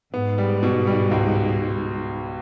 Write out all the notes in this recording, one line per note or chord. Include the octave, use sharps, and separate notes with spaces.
G#2 B3
G3
B2
G3
C#2